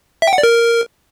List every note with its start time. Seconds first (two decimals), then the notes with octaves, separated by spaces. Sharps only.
0.22 E5
0.27 G5
0.33 F#5
0.38 D5
0.43 A#4